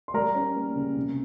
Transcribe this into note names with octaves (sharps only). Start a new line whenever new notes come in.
C6
G3 A#4 A#5
C#4
A#3
C#3
C3